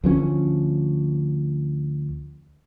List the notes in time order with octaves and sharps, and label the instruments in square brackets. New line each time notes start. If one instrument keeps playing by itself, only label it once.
[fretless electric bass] D2 F3 G#3 C#4